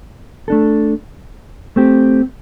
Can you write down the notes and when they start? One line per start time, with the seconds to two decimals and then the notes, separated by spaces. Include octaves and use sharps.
0.48 A3 D4 A4
1.76 A3 C4 G4